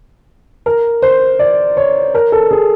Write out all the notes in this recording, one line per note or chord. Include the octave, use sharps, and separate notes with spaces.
A#4
C5
D5
C#5
A#4
A4
G#4